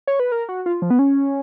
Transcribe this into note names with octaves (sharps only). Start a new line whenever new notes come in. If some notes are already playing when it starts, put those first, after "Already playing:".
C#5
B4
A#4
F#4
F4
F3
B3
C#4